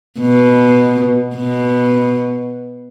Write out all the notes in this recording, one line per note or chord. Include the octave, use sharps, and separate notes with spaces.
B2
B2